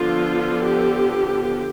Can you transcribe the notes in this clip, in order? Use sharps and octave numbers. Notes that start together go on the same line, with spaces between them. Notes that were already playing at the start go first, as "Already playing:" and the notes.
Already playing: D3 F3 B3 D4 F4
G4